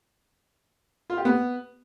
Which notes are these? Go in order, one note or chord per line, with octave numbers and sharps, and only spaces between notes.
F4
G4
B3